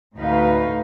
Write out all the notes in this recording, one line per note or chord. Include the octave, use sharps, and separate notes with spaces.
D2 A2 A3 D#4 B4 F5